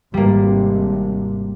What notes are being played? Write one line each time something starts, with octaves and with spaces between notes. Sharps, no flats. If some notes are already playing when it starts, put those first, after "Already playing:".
G#1 C3 G3 A#3